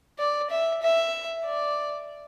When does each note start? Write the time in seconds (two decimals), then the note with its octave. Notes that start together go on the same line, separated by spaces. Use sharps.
0.19 D5
0.51 E5
0.82 E5
1.46 D5